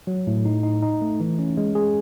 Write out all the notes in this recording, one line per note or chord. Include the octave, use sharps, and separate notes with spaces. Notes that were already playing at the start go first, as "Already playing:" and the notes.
F#3
A2
D#4
D#4
D#4
A3
E3
C#4
G#3
G#4